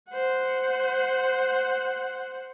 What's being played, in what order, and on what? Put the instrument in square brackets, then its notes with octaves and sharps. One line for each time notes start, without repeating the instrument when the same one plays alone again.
[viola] C5 F#5